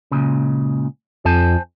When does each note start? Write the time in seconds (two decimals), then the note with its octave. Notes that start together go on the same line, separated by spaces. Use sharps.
0.12 C#2 A#2 C#3
1.25 F2 C5 G#5 A5